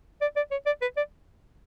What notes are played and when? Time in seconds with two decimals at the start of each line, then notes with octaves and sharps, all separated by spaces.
0.21 D5
0.36 D5
0.51 C#5
0.66 D5
0.82 B4
0.97 D5